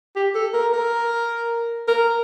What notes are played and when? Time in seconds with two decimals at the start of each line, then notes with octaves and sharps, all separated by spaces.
0.16 G4
0.35 A4
0.53 A#4
0.73 A#4
1.88 A#4